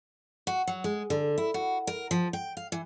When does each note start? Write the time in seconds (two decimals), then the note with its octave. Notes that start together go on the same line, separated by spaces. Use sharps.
0.47 F#4
0.67 F#3
0.84 G#3
1.10 D3
1.38 E4
1.54 F#4
1.87 A#4
2.11 F3
2.33 G5
2.57 F5
2.72 E3